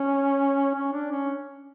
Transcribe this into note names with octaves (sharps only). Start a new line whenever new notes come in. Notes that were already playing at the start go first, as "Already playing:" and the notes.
Already playing: C#4
C#4
D4
C#4